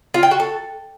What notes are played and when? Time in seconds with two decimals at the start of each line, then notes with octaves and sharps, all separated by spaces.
0.14 F4
0.23 G5
0.31 F#4
0.40 A4